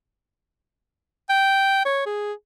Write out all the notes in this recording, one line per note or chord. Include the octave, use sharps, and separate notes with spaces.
G5
C#5
G#4